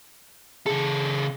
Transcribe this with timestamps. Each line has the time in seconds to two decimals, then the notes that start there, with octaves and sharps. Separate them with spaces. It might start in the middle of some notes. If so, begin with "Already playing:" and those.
0.66 C#3 G#4 A4